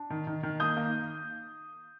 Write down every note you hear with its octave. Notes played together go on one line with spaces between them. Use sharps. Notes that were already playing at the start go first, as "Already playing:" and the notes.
Already playing: D4
D#3
D#3
D#3
A#3 D#6 G6
A#3